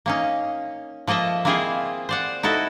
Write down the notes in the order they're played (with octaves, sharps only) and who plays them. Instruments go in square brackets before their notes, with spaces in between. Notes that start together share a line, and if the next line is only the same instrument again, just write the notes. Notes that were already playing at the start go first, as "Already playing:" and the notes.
[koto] A#3 C#4 D#4
F3 A#3 A4 D#5 E5
A#3 C4 E4 F4 G#4 D#5
C5 D5 F#5
D#4 E4 F#4 A4